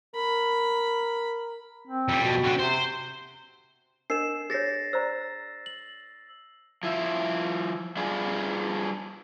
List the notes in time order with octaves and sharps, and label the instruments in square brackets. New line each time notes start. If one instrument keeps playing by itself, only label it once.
[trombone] A#4 [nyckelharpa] B5
[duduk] C4
[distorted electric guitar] F2 G3
[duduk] B2
[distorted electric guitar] D3 C4 [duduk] F#4
[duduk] C3 [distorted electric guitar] C5
[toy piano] D4 A#4 D#5 [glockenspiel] C7 E7
[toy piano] G#4 C#5 [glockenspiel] A6 A#6 C7
[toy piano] C5 D5 A#5 [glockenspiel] E6
[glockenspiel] F#7
[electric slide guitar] F3 E4
G3 D4 F4 G#4